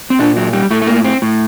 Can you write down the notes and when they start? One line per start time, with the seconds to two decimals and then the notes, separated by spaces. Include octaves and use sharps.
0.10 C4
0.19 A#2 D4
0.36 F#3
0.53 G3
0.71 A2 A3
0.82 A3
0.87 A#3
1.05 C4
1.22 A2